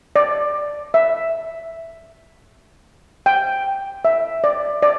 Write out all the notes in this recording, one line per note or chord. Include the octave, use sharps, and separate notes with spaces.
D5
E5
G5
E5
D5
D5